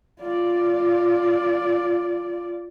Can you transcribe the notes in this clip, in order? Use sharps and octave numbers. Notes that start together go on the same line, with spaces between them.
F4 D5